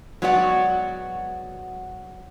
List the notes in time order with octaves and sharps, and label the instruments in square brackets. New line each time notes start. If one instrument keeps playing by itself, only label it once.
[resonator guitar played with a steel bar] F#3 G#3 B3 F#4 D5 F#5